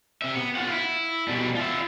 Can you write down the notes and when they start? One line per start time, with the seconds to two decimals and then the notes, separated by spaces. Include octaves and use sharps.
0.22 C3 E5
0.35 B3
0.55 F4 F#5
0.69 E4
1.28 B2 G3
1.55 F4 E5